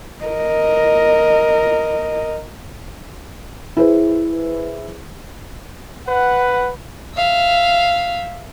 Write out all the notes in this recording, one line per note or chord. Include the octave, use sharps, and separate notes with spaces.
A#4 D#5
E4 G#4 B4 C5
B4 F#5
E5 F5